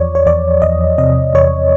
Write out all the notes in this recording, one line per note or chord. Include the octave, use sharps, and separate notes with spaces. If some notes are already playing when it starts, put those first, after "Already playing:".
Already playing: E2 F3 C#5 D5
C#5
E2 D5
E2 D#5
C3 D#5
E2 C#5